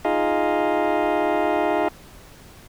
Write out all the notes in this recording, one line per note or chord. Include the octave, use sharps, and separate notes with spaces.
D#4 F4 G#4 D#5 F5